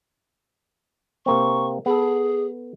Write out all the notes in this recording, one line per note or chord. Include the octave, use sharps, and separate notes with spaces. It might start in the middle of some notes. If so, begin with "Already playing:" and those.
C3 A#3 C4 C#6
B3 G#4 A4